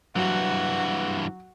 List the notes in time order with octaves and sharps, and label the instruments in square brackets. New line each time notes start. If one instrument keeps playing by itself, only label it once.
[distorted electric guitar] G2 E3 [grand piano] F#3 [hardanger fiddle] F#4